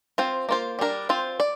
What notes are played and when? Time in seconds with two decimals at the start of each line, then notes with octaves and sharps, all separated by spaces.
0.18 C4 F4 C5
0.49 A#3 F4 C5
0.79 G3 D4 A#4
1.09 C4 F4 C5
1.40 D5